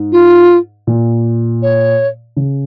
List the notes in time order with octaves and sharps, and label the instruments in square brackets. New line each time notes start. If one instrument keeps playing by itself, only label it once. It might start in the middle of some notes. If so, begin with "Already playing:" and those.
Already playing: [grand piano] G#2
[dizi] F4
[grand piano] A#2
[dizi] C#5
[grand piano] C#3